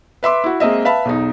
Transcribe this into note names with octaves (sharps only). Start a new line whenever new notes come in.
B4 E5 C6 D6
E4 F#4
G#3 A#3 C4 D#5 E5
B4 E5 F5 A5 B5
B1 E2 D#4